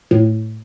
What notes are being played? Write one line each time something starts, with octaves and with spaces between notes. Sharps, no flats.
A2